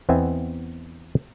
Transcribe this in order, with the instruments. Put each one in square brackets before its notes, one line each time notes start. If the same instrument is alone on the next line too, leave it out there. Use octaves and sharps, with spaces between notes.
[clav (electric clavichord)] E2 B3 C4 D#5 E5 G#5